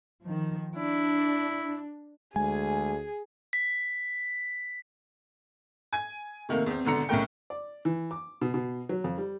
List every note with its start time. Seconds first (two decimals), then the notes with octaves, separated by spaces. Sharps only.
0.23 D#3 F3
0.76 D4 E4
2.36 D2 G#3 G#4 G#5
3.53 B6
5.93 G#5 G#6
6.49 C3 D#3 A3 A#3
6.66 E2 C4
6.85 G#1 B2 D3 A#5 C#7
7.09 B1 A2 C#3 A3 A#4 G5
7.50 D5
7.85 E3
8.11 D6
8.41 B2
8.54 B2
8.89 F#3
9.04 F2
9.18 G3